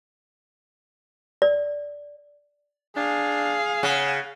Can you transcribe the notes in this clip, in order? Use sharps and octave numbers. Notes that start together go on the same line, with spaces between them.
D5
D4 G#4 F5
C#3 F#5